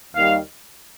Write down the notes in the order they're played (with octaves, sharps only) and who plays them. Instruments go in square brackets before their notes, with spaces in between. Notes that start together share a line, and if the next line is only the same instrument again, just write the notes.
[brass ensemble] D#2 D#3 G3 F5